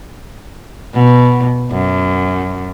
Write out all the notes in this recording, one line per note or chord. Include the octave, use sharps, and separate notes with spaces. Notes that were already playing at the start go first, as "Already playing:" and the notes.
B2
F#2